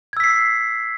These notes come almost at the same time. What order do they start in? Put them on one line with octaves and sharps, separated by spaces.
G#6 E6 B6 C7